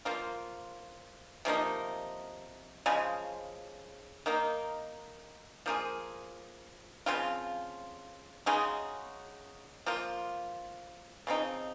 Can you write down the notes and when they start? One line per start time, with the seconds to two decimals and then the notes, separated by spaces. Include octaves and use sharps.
0.05 F3 A#3 F4
1.45 C3 F3 A#3 D#4
2.86 C#3 F3 G#3
4.26 D#3 A#3 D#4
5.66 F3 A#3 F4 G#4
7.06 C#3 F3 C4 F4
8.46 C#3 G#3 D#4 F#4
9.86 F3 A#3 F4
11.27 C#3 F3 C4 D#4